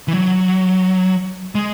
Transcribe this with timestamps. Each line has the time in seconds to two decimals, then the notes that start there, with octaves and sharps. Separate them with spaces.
0.08 E3
0.13 F#3
1.55 G#3